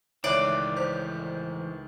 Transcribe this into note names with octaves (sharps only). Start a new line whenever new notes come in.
C#2 D#3 E3 A3 C#5 D5 E5 F#6
C5 G6